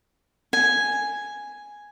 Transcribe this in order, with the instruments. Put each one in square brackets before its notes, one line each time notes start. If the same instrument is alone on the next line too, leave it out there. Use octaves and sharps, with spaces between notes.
[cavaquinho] G#5